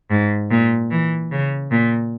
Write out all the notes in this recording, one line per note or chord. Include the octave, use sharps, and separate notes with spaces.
G#2
A#2
E3
C#3
A#2